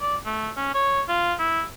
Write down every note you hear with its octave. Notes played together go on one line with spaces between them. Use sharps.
D5
A3
C#4
C#5
F4
E4